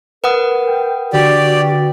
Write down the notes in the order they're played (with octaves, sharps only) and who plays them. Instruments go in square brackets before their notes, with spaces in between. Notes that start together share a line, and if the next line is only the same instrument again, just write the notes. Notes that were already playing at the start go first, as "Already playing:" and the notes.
[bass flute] A#4 [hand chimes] B4 F#5 D#6
[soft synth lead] G5
[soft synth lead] D3 [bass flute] F#4 [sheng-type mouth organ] G4 D5